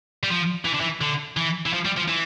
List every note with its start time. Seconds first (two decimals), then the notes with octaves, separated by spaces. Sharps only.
0.23 G3
0.30 F3
0.65 E3
0.74 D3
0.81 E3
1.01 D3
1.37 E3
1.66 E3
1.73 F3
1.85 G3
1.97 F3
2.08 E3